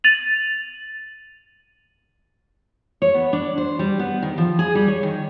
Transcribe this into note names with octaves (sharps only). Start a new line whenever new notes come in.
A6 D#7 F7 F#7
C#5
B3
D4
C5
G3
B3
D#3
F3
G#4
G3
C#5
D#3